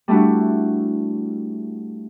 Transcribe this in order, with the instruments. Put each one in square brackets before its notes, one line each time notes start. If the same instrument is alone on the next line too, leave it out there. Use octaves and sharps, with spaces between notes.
[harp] G3 A3 D4 E4 F#4